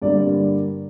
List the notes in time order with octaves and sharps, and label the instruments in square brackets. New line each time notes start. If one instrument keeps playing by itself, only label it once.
[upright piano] G2 D3 G3 A#3 D5